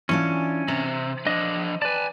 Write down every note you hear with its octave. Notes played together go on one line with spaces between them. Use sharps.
E3 C#4 D4 F4
C3 C5
F3 D4 D#5
B4 D5 G#5 A5